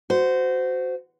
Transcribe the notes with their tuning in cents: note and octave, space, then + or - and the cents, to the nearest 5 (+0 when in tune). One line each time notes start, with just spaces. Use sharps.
F#4 +0 C5 -20